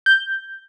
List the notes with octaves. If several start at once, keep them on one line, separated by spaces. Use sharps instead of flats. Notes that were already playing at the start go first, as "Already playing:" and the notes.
G6